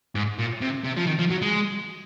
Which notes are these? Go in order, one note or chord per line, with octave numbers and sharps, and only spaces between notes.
G#2
A#2
C3
C3
F3
D#3
F3
F#3
G#3